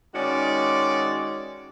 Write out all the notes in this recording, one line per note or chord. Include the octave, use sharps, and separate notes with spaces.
D#3 G#3 C#4 F#4 D5